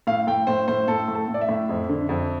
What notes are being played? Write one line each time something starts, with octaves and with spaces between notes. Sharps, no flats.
A2 F5
A2 G5
A2 C5
A2 C5
A2 A4
A2
A4
A2
D5
E5
A2
F2
D3
F2